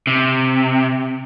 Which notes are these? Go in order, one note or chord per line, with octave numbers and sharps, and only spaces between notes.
C3